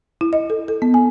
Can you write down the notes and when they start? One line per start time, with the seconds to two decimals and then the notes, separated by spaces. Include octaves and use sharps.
0.21 E4
0.33 D#5
0.50 A4
0.68 A4
0.82 B3
0.94 G#5